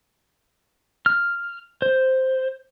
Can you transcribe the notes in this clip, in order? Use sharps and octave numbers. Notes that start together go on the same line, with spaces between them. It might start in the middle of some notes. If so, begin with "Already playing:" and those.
F6
C5